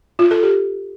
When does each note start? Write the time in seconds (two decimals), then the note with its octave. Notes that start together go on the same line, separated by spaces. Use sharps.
0.19 F4
0.31 A4
0.43 G4